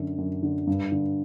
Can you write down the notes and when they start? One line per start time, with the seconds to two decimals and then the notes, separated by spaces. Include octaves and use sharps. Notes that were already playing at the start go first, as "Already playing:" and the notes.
Already playing: F#2 D3
0.18 F#2
0.43 D3
0.67 G2
0.92 D3